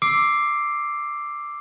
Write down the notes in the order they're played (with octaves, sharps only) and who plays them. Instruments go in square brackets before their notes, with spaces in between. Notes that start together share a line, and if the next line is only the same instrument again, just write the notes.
[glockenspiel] D6 E6 C7 D7